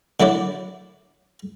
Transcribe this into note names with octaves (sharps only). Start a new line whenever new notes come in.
D3 F#3 E4 D5